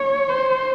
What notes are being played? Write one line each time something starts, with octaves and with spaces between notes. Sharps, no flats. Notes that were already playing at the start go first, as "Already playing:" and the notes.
Already playing: C#5
C5